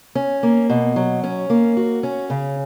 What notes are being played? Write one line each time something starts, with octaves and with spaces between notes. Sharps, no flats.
C#4
A#3
B2
F#3
C#4
A#3
F#4
C#4
C#3